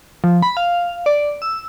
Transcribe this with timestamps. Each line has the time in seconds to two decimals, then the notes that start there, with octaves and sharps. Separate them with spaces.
0.24 F3
0.42 B5
0.57 F5
1.06 D5
1.42 E6